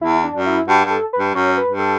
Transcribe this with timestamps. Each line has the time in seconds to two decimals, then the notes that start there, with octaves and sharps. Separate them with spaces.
0.01 E2 E4
0.24 D4
0.34 F#2
0.46 E4
0.67 G2 F#4
0.85 G2
0.90 A4
1.13 B4
1.19 G2
1.34 F#2 C#5
1.57 B4
1.68 G2
1.79 A4